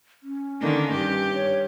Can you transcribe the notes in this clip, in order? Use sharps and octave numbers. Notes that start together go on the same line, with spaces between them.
C#4
D3 D#3 A#3
G2 G4
C#5